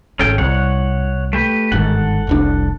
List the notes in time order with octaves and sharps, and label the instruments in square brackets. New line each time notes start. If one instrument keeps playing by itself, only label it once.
[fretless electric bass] G#1 [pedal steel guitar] C#4 A4 G5
[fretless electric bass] C2 [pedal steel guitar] C#5 F#5
[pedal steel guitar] A3 G4 B4
[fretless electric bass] G1 G#2 D#3 [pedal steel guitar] A4 F#5
[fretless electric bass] F1 C2 D4